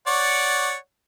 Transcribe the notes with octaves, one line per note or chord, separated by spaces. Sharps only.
C#5 D5 F#5